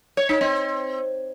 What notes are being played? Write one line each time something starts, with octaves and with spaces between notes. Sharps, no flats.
C#5
D#4
C4